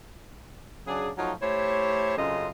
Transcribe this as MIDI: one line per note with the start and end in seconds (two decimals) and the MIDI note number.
0.87 1.09 49
0.87 1.09 54
0.87 1.09 62
0.87 1.09 68
1.18 1.32 53
1.18 1.32 54
1.18 1.32 57
1.18 1.32 63
1.18 1.32 65
1.18 1.32 66
1.41 2.17 57
1.41 2.17 64
1.41 2.17 67
1.41 2.17 72
1.41 2.17 73
2.17 2.49 42
2.17 2.49 49
2.17 2.49 60
2.17 2.49 65
2.17 2.49 69
2.17 2.49 75